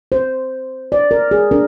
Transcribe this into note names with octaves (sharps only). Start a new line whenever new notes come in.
C5
D5
A#4
G#4
D4 A#4